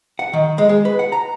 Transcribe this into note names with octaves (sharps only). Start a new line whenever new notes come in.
F#5
D#3
G#3
G#3
B4
F#5
A#5